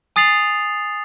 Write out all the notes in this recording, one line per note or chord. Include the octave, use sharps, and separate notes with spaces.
G#5 D#6 A6 C7 F7 F#7